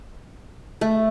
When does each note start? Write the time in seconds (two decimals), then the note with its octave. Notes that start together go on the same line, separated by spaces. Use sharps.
0.81 A3